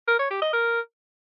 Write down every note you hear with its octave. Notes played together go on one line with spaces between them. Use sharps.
A#4
C#5
G4
D#5
A#4